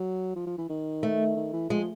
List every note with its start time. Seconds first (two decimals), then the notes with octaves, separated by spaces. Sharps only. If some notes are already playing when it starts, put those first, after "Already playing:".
Already playing: F#3
0.36 F3
0.47 F3
0.58 E3
0.69 D#3
1.03 A3
1.37 D#3
1.53 E3
1.70 F3 G#3